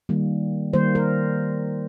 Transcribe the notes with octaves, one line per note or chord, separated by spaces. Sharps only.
D#3 G3 A#3
D#3 G3 A#3 C5
A#4